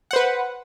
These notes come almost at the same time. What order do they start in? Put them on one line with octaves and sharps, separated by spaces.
F#5 C5 B4